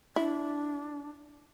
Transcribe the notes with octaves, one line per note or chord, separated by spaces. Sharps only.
D4 E4